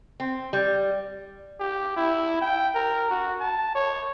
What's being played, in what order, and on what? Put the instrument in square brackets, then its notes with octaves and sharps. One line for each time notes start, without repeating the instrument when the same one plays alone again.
[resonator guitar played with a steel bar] C4
G3
[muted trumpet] G4
E4
G5
A#4
F#4
A5
C#5